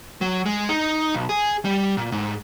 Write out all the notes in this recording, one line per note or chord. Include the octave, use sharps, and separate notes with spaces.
F#3
G#3
D#4
B1
G#4
G3
A#2
G#2